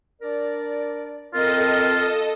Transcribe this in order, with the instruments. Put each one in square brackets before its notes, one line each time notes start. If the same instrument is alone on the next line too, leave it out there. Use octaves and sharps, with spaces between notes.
[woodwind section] D4 A#4 D5
[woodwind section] C4 A#4 [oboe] F4 [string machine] A4 D#5